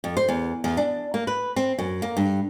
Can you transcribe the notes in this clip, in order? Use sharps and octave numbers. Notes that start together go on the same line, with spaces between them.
F2
C5
E2
E2
D4
A#3
B4
C4
F#2
A#3
G2